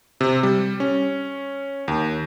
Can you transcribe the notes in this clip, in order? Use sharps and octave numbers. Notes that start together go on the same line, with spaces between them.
C3
G3
C#4
D#2